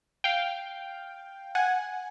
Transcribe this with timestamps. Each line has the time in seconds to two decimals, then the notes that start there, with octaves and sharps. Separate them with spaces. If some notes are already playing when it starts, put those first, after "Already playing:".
0.24 F5 G5
1.55 F#5 G#5